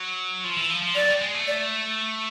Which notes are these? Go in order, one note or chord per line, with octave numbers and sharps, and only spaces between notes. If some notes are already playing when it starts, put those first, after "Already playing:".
Already playing: F#3
F3
E3
F3
F3
F#3 D5
G3
G#3
A3
D5